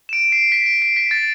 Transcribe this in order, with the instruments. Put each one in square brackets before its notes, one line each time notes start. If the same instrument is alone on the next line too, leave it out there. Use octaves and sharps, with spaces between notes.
[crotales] E7
D7
C7
B6
D7
C7
B6
A6